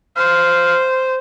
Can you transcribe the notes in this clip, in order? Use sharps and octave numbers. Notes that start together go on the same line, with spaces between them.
C5 F5